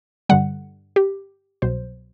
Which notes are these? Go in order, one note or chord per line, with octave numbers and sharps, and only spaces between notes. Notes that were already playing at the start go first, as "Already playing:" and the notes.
G2 D3 G3 F#5
G4
C2 B2 F#3 C5